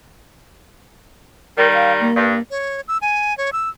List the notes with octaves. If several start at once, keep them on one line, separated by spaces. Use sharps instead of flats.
D#3 G3 A#4
F5
A#3
G2
C#5
E6
G#5
C#5
E6